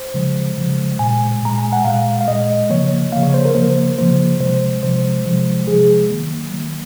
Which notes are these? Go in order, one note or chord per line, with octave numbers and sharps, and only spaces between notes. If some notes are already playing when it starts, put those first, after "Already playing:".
Already playing: C5
C#3 F3 G#3
C#3 F3 G#3
A#2 G#3 G#5
A#2 G#3 A#5
G#5
F#5
A#2 G#3 F5
F5
A#2 G#3 D#5
C#3 F3 A#3 C#5
C#3 F3 A#3 F5
C#5
C5
A#4
C#3 F3 A#3 C5
C#3 F3 A#3 C5
C3 F3 G#3 C5
C3 F3 G#3 C5
C3 F3 G#3
C3 F3 G#3 G#4
D#3 F#3 A#3
D#3 F#3 A#3